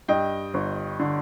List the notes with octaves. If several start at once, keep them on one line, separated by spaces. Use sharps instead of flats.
G2 D#5 G5
G1
D3